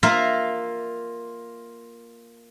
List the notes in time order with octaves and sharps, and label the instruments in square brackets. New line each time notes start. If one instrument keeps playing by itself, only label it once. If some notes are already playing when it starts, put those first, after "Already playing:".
[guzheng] A#3 F4 A#4 E5 F5 A#5